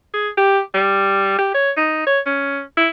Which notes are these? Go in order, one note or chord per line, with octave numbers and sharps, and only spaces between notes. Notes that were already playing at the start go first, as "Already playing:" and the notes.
G#4
G4
G3
G4
C#5
D#4
C#5
C#4
E4